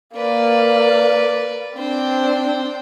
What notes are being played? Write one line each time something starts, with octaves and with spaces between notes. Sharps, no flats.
A#3 B4 D5
C4 D4 C5 G5